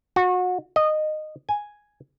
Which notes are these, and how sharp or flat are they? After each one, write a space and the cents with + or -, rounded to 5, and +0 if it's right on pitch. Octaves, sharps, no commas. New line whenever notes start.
F#4 -30
D#5 -15
G#5 +0